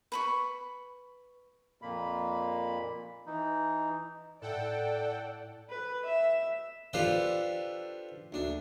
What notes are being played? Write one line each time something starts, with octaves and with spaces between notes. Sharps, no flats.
B4 B5 C#6
F2 A#2 A#3 B5
E3 D#4
A2 A4 D5 F#5 G5
B4
E5
D4 F4 G4 A4 B4 C5
D2 D4